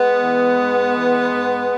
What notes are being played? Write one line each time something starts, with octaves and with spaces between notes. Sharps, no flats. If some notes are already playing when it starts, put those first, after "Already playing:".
Already playing: G#3 B3
E3
G#2
E3
G#2